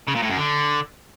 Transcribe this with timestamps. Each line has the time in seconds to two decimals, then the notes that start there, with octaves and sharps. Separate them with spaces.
0.08 C#3
0.15 A#2
0.22 A2
0.30 F#2
0.37 D3